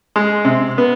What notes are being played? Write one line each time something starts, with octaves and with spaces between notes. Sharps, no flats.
G#3
C3
B3